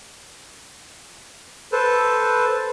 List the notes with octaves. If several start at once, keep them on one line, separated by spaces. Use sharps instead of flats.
A4 B4 C5